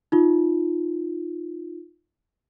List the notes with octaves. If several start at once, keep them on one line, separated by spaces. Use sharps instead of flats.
D#4 F4